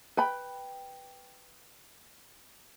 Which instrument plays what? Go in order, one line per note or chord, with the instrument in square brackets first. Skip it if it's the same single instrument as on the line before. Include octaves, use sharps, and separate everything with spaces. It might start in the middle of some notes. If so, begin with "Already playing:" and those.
[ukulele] B4 G5 B5